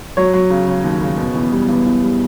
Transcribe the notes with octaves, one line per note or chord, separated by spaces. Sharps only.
F#3 C#5
F#3
C#3
C#3
D#2
C#3
B2
E2
G3
E2
E2
G3